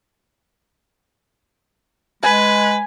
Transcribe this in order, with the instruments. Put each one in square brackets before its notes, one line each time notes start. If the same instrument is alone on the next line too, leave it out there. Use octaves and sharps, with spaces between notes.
[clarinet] G#3 [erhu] B4 [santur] G#5